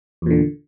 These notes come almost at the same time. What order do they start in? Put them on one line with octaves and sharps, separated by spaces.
E2 A#2 D3